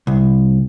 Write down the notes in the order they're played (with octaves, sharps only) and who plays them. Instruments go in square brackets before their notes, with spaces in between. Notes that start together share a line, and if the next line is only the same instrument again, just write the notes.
[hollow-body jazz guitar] C2